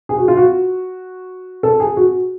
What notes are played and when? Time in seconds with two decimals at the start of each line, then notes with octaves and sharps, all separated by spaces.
0.09 G#4
0.18 F#4
0.28 F4
0.37 F#4
1.63 A4
1.80 G#4
1.97 F#4